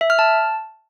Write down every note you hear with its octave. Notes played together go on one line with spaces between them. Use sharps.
E5
F6
A5